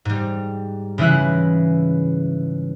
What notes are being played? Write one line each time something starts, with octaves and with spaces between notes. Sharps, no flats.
G#2 G3
C#3 E3 G#3 E4 F#6